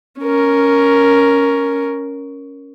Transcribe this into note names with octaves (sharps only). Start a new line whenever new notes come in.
C#4 A#4